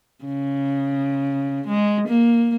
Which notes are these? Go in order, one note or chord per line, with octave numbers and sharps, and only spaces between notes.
C#3
G#3
A#3